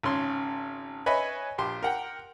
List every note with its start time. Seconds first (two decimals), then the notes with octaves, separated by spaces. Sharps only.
0.03 G#1 C#3 C#4 C6
1.06 B4 C#5 D#5 E5 G#5 B5
1.58 A#1 G4 C6
1.82 A#4 F#5 G5